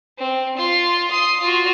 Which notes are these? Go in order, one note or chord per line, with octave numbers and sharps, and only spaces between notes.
C4
F4 C6
C6 D#6
F4 F#4